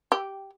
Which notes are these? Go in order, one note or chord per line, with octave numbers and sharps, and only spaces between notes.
G4